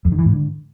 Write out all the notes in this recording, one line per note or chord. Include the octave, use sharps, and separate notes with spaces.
F2
D#3
E3
G#2
D3